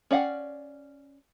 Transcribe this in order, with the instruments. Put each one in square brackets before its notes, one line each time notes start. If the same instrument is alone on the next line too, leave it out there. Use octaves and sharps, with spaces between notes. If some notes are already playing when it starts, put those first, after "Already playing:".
[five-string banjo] C#4 D5 F5 F#5